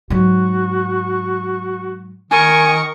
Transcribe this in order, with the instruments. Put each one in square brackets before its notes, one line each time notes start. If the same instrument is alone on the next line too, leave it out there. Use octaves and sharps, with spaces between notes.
[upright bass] G#2 F#3 [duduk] F#4
[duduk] D#3 [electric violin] A#4 C#6 [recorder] G#5